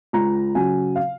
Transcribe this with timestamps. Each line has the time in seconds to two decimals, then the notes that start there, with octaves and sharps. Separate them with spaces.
0.13 C#2 A#5
0.55 C#3 F#3 G#5
0.96 F5